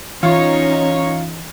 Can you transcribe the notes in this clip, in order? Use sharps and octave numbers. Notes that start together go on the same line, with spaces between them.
E3 C#4 D#4 F4 C#5